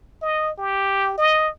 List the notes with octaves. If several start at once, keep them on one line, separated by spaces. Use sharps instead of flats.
D#5
G4
D#5